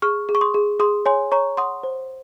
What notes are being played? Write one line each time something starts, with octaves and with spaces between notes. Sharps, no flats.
G#4 C#6 F6
G#4
C#6
C6 D#6
G#4
G#4 C6 D#6
C#5 G#5 C6
C#5 A#5 C#6
F#5 C6 D#6
C5